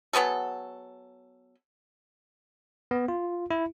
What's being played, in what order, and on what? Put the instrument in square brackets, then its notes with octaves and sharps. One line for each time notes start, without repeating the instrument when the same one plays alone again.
[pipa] F#3 B3 G#4 A4
[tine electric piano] B3
F4
E4